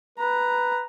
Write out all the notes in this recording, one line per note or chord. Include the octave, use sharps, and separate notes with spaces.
B4 A#5